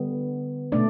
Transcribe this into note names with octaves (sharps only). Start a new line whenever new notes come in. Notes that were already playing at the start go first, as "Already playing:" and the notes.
Already playing: D3 G3 B3
B2 A3 D4 D5